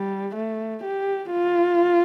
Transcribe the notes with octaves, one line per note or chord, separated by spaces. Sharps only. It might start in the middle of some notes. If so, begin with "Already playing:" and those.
Already playing: G3
A3
G4
F4